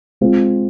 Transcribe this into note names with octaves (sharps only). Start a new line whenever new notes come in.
G#3 C4 F4